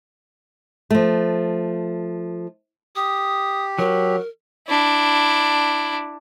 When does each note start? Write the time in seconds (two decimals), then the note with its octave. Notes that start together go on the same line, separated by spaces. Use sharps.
0.90 F3 A3
2.96 G4 D#6
3.79 F#3 A#4
4.68 D4 E4